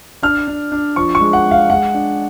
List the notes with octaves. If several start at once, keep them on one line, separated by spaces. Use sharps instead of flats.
D4 F6
D4
D4
F3 C#6
C#6
G#3
F#5
G#3
F5
G#3 F#5
D4